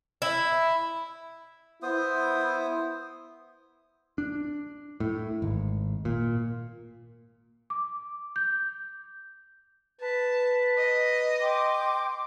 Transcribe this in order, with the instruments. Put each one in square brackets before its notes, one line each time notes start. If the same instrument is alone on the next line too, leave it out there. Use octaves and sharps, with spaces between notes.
[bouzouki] E4
[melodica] B3 C5 D#6 [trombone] E4
[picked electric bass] D4
A2
G#1
A#2
[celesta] D6
G6
[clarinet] B4 [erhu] A5
[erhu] D#5
[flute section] G5 C6 D6